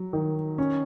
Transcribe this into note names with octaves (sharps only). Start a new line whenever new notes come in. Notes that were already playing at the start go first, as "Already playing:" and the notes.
Already playing: F#3
D#3
C#4